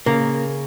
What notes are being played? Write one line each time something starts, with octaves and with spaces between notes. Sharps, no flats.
C#3 A#3